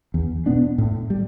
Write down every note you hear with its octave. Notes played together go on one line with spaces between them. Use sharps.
E2
B2 B3 D4
A2
G3